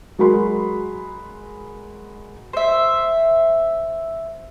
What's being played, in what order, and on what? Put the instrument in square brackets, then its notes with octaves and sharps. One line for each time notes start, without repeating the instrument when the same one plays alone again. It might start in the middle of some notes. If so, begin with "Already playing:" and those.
[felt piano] F#3 G#3 F#4 A#4 B5 C6
[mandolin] C5 E5